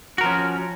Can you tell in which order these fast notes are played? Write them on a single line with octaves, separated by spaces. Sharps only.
F#4 A#4 F3 C#4